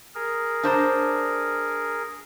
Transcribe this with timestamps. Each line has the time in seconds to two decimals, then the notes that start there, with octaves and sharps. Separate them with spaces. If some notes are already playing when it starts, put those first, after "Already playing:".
0.15 G#4 A#4
0.63 D4 C5 A#5